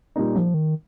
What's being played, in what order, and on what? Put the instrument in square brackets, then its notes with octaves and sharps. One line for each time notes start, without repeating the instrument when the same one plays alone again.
[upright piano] A#2 G3 A#3 D#4
[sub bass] F3
D#3